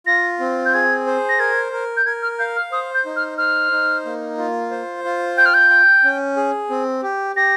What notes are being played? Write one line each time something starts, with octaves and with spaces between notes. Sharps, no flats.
F4 A#6
C4
G6
G#4 G#6
C5
A#6
A#4 G#6
A#4
G6
A#4 G#6
F6
F5 G6
F6
C5 D#6
G6
D#4
F6
C5 F6
D#4
A#3
F4
C5
F4
G5 G6
F6
G6
G5
C#4
G#4
C4
G4
G4 A#6